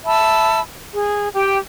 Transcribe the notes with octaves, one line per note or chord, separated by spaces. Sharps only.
E5 A5 B5 E6
G#4
G4 G5